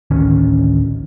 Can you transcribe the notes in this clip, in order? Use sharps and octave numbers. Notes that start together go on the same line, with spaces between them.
A1 D2 D#3 C#4